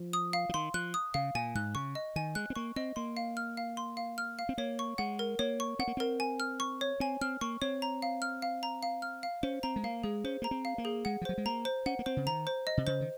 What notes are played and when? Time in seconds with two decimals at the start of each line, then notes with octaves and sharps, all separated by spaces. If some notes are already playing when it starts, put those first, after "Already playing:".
Already playing: F3
0.13 D#6
0.33 F5
0.49 F3
0.54 D#3 C6
0.74 F3 F#6
0.94 D#6
1.14 C#3 F5
1.35 A#2 G#5
1.55 G#2 F#6
1.75 C#3 C#6
1.95 D#5
2.16 D#3 G#5
2.35 G#3 F#6
2.50 C4
2.56 A#3 C#6
2.76 C4 D#5
2.96 A#3 C6
3.17 F5
3.37 F6
3.57 F5
3.77 C6
3.97 F5
4.18 F6
4.39 F5
4.49 C4
4.58 A#3 C#5
4.79 C#6
4.98 G#3 F#5
5.19 A#4
5.39 A#3 C#5
5.60 C#6
5.79 C4 F#5
5.88 A#3
5.97 C4 A#4
6.20 G#5
6.40 F6
6.60 C#6
6.81 C#5
7.00 C4 G#5
7.21 C4 F6
7.41 A#3 C#6
7.62 C4 C#5
7.82 A#5
8.02 F5
8.22 F6
8.42 F5
8.63 A#5
8.83 F5
9.02 F6
9.23 F5
9.43 C#4 C5
9.63 C4 A#5
9.76 G#3
9.84 A#3 F5
10.03 G#3 G#4
10.24 C#4 C5
10.42 A#3 A#5
10.51 C4
10.65 F5
10.78 A#3
10.85 G#4
11.05 G#3 F#5
11.21 F3
11.25 F#3 C5
11.38 G#3
11.46 A#3 A#5
11.65 C5
11.86 C#4 F#5
11.99 A#3
12.06 C4 C5
12.17 C#3
12.26 D#3 A#5
12.47 C5
12.67 D#5
12.77 C3
12.87 C#3 C5
13.01 D#3